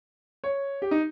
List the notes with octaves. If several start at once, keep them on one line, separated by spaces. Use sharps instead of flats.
C#5
G4
D#4